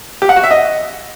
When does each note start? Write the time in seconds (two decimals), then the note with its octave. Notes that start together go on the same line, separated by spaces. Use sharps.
0.22 G4
0.29 F#5
0.36 F#4
0.43 E5
0.51 D#5